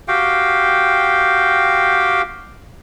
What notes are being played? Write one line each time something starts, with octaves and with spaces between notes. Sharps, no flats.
F#4 G4 F5 G5